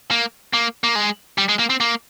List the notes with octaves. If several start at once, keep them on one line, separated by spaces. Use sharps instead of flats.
A#3
A#3
A#3
G#3
G3
G#3
A#3
C4
A#3